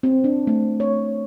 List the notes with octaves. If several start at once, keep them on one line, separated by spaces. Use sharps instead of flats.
C4
D4
A3
C#5